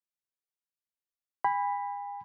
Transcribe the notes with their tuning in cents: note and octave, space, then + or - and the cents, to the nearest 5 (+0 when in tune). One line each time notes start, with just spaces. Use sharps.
G#5 -40 B5 +0